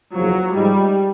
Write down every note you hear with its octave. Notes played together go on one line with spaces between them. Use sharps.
F#1 E2 C#3 F3 F#3
G#2 F3 G3 G#3